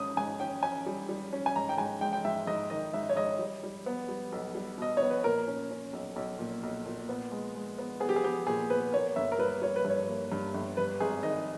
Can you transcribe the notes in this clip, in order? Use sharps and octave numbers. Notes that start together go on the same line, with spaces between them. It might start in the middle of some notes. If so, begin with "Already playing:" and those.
Already playing: G#2 C#4 D#6
G#2 G#5
C#4 G5
C#4 G#5
G3
G3
C#4
G#5
G#2 A#5
G5
G#2 G#5
G#3 G5
G5
G#2 E5
G#2 D#5
D#3 D#5
G#2 E5
C#5
G#2 D#5
G3
G3
B3
G3
B1
G3
B2 D#5
B3 C#5
B4
A#2 A#4
C#4
C#4
B1
B1
A#2
B1
A#2
B3
G#3
G#3
B3
B3 G#4
G4
G#4
B3 G4
A#2 G#4
B3 B4
A#3 C#5
G1 E5
A#4
G3 B4
G3 C#5
B4
G2
C#5
A#3
G2
G1
G2 B4
G#1 G#4
D#3 D#5